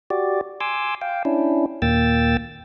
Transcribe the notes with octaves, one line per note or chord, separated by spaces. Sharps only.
F#4 G4 D5
G#5 C6 D6 E6
F5 G5
C#4 D4 E4
D#2 A#2 A#3 G5 E6 A6